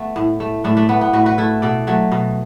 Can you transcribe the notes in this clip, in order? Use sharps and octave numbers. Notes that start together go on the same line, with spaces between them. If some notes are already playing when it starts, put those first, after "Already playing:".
Already playing: A3 B3
A2
A3
A2 A3 D4
A3 D4
A3 B3
B3
A2 F#4 B4
F#4 B4
A3 E4 A4
B2 A4 D5
F#3 A3
B2